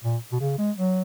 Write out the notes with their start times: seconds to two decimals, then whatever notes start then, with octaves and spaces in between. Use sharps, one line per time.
0.04 A#2
0.32 B2
0.41 C#3
0.58 G#3
0.78 F#3